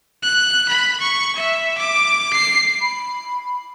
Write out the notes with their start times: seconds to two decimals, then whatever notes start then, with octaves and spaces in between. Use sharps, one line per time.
0.23 F#6
0.69 B5
1.00 C#6
1.36 E5
1.78 D6
2.33 C7
2.82 B5